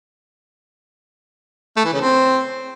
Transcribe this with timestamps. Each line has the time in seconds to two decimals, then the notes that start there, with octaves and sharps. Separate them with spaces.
1.77 A3
1.85 E3
1.93 C#3
2.01 C4